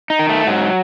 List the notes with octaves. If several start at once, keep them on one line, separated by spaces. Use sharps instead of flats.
D#4
D#3
A3
G#2 F#3